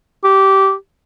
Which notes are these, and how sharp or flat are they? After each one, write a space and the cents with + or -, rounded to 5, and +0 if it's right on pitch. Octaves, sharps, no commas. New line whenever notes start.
G4 -15